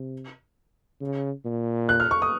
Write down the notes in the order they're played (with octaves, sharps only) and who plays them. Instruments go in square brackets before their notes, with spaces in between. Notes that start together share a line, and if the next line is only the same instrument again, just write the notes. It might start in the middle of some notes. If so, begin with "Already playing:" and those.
Already playing: [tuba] C3
C#3
A#2
[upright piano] F#6
F6
C#6
D#6